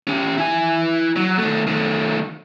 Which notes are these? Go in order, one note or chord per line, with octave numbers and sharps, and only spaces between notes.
C#4 G4
E4 G#5
F#3
D#3 A3
D#3 A3